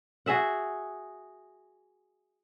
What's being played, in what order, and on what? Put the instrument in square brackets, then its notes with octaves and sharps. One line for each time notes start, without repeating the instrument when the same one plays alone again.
[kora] F#4 G#4 E5 F#5